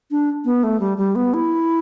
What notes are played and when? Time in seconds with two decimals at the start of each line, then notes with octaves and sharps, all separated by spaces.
0.11 D4
0.45 B3
0.63 A3
0.80 G3
0.98 G3
1.15 B3
1.34 E4